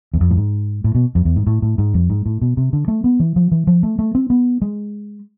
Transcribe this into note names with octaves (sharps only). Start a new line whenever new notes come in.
E2
F2
A2
G#2
A2
B2
F2
E2
G#2
A2
A2
G#2
F2
G#2
A2
B2
C3
D3
A3
B3
E3
F3
E3
F3
A3
A3
C4
B3
G#3